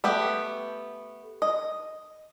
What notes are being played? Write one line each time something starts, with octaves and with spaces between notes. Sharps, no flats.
A3 B3 G4
D#5